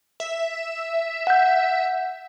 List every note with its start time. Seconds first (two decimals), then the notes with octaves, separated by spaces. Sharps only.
0.20 E5
1.27 F#5 G6